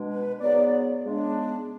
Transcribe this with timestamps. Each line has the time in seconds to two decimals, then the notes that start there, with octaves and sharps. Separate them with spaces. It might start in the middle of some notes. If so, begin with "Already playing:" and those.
Already playing: B2 G#3 D4
0.09 B4
0.40 G#2 F#3 B3 D5
1.05 C#3 G#3 B3 D4